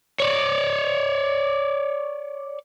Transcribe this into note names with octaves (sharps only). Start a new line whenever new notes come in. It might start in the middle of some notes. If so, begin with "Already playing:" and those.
C#5 D5